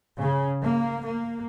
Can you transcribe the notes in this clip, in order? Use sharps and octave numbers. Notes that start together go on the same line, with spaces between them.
C#3
A#3
A#3